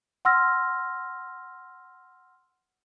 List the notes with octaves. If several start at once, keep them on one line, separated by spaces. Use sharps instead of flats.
F#5 C6 E6 F6 A#6